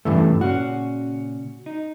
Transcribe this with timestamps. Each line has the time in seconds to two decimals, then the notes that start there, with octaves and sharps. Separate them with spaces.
0.05 E2 G2 C#3 E3 A3
0.41 A#2 C#3 C#4 F#4
1.66 D#4